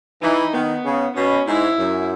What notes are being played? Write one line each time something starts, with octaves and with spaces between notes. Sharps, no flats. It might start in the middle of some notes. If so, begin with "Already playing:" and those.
E3 D#4
D#3 B3
C#3
B2 C#4
G#2 E4
F#2